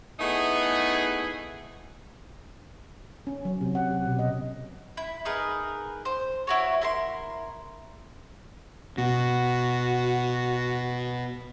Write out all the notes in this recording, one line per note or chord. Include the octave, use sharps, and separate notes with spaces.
A3 B3 D#4 E4 G#4
C#4
F#3
C3
F#5
G4
B2
D#5
E4
D#4 G#4 A#4 B4
C5
E4 F#4 C#5
E4 A#4 C6
B2 F#4